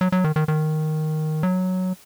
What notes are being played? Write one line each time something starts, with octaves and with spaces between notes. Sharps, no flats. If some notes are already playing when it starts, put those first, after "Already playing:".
F#3
F#3
D#3
D#3
D#3
F#3